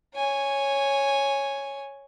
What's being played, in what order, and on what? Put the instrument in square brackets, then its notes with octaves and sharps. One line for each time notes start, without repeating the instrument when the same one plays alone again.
[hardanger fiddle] C#5 G#5